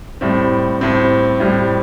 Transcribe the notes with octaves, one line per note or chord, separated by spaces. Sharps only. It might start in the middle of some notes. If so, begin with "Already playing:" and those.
A2 G3 C4
A2 G3 C4
A2 G3 C4